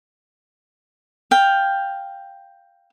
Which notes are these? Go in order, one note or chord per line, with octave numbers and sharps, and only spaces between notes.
F5 G5